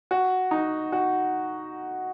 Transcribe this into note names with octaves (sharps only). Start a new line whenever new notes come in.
F#4
D#4
F#4